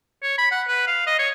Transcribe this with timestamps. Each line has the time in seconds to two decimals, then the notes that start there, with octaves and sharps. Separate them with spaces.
0.23 C#5
0.38 B5
0.51 F#5
0.68 B4
0.87 F5
1.07 D#5
1.19 C#5